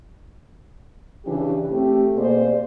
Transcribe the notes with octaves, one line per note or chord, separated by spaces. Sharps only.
C#3 E3 C#4 D4 G4
A3 C4 G4
B2 A#3 G#4 C5 D5